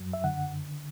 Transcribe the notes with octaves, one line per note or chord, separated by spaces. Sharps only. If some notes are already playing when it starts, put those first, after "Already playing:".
Already playing: F#2 F#3
E5
D3 F#5